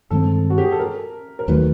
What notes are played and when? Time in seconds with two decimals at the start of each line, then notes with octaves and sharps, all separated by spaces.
0.11 G2 D#3 G#3 C4 A4
0.50 F#4
0.58 G4
0.64 G#4
0.72 A4
0.79 A#4
1.39 A#4
1.48 D#2 D#3 F#3 A3 B4